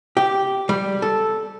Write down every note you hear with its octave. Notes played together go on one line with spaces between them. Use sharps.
G4
G3
A4